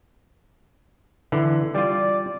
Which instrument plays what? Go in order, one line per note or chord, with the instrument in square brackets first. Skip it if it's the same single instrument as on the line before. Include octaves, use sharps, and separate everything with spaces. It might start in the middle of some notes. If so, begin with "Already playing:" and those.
[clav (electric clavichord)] D3 E3
[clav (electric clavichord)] G3 F4 [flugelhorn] D5